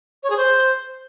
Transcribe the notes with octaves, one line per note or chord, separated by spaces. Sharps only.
C#5
G#4
C5